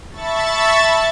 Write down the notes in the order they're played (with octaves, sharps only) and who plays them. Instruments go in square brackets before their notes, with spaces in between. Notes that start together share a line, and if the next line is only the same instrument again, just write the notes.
[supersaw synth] E5 A5 B5 C#6 A6